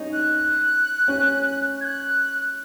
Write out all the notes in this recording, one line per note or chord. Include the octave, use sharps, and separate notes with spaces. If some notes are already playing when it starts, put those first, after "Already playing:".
Already playing: C#4 D#4
F#6
C#4
G#6
F#6